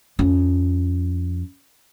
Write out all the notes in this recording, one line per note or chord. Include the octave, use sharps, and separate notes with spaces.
F2 C#4